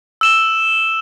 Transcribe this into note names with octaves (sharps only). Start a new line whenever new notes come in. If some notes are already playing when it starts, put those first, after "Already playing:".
E6 E7 G7